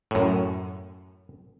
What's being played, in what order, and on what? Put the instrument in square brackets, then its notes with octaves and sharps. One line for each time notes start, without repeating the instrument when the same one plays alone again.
[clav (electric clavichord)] F#2 A2